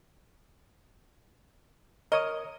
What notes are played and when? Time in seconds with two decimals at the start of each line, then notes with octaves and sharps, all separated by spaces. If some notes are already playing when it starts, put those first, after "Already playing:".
2.12 A#4 C#5 D#5 D#6